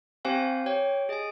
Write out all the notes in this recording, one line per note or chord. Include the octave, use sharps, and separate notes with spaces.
C4 G4 C5 F5 G#5
G4 C#5 G5
G#4 D#5 G#5